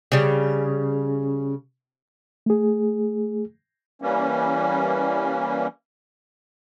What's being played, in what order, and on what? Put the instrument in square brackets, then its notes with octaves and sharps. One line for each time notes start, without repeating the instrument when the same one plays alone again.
[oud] C#3 G3
[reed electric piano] A3 G#4
[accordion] E3 G3 A#3 C#4